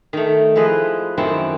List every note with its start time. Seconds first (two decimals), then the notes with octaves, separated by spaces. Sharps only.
0.13 D#3 A3
0.55 F3 G#3 E4 B4 D#5
1.17 F#2 D#3 C4 E4 F#5 A5